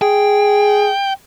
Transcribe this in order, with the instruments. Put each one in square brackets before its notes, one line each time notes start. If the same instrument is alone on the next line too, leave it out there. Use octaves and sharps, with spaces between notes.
[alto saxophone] G#4 [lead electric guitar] G5